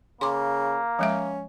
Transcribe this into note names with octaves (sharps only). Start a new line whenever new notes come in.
C#3 A#3 C6 D6
F3 G#3 C#4 E5